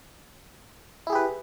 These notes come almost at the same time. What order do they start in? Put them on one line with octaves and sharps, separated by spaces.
E4 G#4 G4 B4